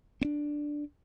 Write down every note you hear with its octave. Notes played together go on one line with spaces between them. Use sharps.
C4 D4